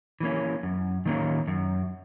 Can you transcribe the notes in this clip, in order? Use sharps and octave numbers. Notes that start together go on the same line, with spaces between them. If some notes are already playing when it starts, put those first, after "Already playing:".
E3 A#3 C#4
F#2
D#3 A#3 C#4
F#2